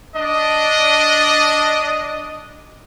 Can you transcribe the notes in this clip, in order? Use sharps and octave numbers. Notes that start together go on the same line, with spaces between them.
D4 D#5